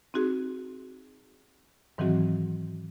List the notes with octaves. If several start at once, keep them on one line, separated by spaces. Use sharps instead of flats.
C4 D#4 F#4 G#4
G#2 D#3 E3 F#3 C4 F#4